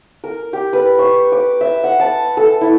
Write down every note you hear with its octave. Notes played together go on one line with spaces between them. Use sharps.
A#4
G4
B4
C#6
D6
E5
F#5
A5
A4
E4